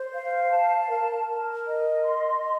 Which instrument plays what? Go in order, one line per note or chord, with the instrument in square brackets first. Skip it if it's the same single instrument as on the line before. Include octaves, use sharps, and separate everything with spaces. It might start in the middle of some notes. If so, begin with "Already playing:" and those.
Already playing: [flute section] C5
F5
A5
A#4
A#4
D#5
C6
D#5